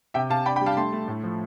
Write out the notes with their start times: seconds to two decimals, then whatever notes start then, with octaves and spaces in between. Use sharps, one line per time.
0.14 C3 E5 G5
0.30 C3 F5 A5
0.46 D4 G5 B5
0.56 G5 B5
0.61 G3 F5 A5
0.77 A3 A5 C6
0.92 A3
1.08 A2
1.23 F3